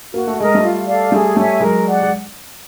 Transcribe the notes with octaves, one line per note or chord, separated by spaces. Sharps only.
A#3 F#4
A3
G#3 A#4 D#5
G3 A3
F4
A4 D5 F5
G3 A3 G#4
G3 A3 C#5 E5 G#5
F#3 G#3 A#4
D5 F#5
G#3